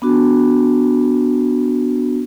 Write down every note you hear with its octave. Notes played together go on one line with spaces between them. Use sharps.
B3 D4 F#4